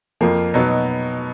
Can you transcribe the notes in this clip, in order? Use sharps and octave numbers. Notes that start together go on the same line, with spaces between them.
F2 F3 A#3
B2 F#3 B3 D#4